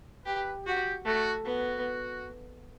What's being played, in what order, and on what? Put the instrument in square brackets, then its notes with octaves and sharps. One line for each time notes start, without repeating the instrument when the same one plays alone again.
[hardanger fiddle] G4 [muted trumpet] B4
[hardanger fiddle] F#4 [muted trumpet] G4
[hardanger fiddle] A3 [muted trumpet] F#4
[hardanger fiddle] B3 [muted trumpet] F#4